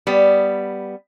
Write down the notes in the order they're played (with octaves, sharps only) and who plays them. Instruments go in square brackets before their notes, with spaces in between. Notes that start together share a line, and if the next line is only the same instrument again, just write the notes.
[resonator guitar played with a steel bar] G3 B3